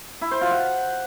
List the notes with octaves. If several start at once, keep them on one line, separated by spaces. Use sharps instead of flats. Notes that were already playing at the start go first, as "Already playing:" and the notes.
E4
C5
F4
F#5